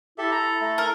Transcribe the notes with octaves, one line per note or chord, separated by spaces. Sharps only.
E4 G4 A4 E5
A#5
A3
A#4